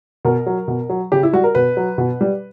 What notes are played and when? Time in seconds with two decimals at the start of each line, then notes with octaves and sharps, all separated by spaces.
0.25 B2 A#4
0.46 F#3
0.68 B2
0.89 F#3
1.12 C#3 G4
1.23 E4
1.33 G3 F#4
1.44 A#4
1.55 B2 B4
1.77 F#3
1.98 B2
2.21 G3